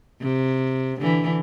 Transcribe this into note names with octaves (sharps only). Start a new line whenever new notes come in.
C3
D3 E3